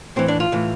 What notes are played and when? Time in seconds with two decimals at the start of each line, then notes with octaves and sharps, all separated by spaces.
0.16 A2 E3 C4
0.28 D4
0.40 F4
0.52 A2 E3